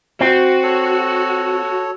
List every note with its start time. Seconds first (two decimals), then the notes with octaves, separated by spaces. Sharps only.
0.21 C4 F#4
0.63 A4 C#5